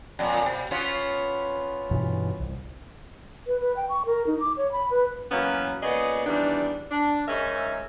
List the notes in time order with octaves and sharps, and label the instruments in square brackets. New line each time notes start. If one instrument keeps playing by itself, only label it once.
[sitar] F2 A#2
B2
B3 C#4 F4
[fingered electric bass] G2 B2 E3
C2
[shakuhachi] B4
B4
G5
C#6
A#4
D#4
D6
C#5
B5
B4
[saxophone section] E3 F#3 A#3 B3 C#4
A#2 C#3 B3 G#4 D5 D#5
E2 D#3 E3 G3 D4 D#4
D4
G#2 C#4 D#4 A#4 E5